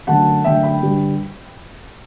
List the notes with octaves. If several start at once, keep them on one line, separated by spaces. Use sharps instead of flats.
F#2 D3 A3 F#5 A5
F#2 D3 A3 E5 G5
G5 B5
G2 D3 G3